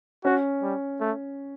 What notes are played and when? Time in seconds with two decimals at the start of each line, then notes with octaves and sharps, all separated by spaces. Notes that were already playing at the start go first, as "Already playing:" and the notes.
0.24 C#4 F#4
0.62 G3
1.00 A3